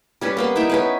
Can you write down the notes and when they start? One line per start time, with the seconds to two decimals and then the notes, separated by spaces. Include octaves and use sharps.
0.21 G3 C#4 B4
0.37 A#3 B3 C6
0.56 D#4 E4 E5 G5
0.69 B3 C#4 B4